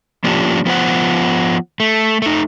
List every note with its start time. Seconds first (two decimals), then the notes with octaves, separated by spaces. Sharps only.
0.24 F3 A#3 C#4 D4 F4 G4
0.66 F3 B3 F4 C5 F#5
1.80 A3
2.22 A3 D#4